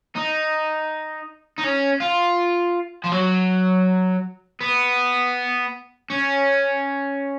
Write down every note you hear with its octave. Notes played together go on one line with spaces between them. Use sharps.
D#4
D#4
C#4
F4
F3
F#3
B3
C#4